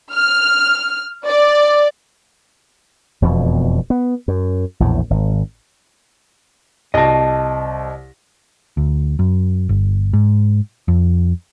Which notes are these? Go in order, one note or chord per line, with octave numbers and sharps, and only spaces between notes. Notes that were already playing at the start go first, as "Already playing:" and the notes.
F6
D5
E1 F2 B2
B3
F#2
A#1 E2 A2
G#1
C2 D#5 A5 A#6
D2
F#2
G1
G#2
F2